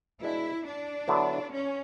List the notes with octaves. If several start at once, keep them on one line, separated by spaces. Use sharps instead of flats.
B2 G#3 D4 E4
D4
D3 F#3 B3 E4
C#4